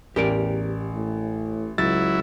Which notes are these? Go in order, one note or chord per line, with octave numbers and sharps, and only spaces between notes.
A1 E2 G4 A#4 D5
A2
C#2 F#3 E4 A6